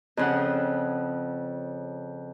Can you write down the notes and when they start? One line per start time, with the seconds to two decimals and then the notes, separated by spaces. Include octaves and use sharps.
0.17 F2 C#3 F#5